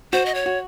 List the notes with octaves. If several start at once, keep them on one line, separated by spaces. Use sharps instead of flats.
F#4 C5
D#5
C#5
F#4